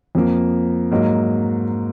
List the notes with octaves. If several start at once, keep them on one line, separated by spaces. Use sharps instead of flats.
F2 F3 A#3
G#2 F#3 A#3 D#4